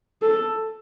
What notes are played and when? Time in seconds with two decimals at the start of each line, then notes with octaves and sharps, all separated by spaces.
0.22 A4